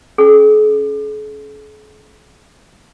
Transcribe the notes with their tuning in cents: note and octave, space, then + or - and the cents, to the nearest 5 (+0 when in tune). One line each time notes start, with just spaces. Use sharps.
C#4 +0 G#4 +45